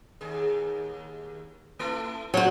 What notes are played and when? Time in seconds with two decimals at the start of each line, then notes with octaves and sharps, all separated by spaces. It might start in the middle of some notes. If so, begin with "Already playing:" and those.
0.21 D#2 G#4
1.79 A3 E4 A4
2.34 F#3 G#3 F4 F#4 C5